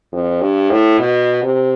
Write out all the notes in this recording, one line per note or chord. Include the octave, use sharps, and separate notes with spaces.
F2
G2
A2
B2
C3